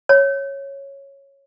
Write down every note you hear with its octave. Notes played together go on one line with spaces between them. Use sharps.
C#5